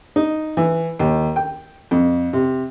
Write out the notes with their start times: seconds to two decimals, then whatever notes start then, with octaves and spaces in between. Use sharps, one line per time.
0.16 D#4
0.57 E3
1.00 D#2
1.36 G5
1.91 F2
2.33 C3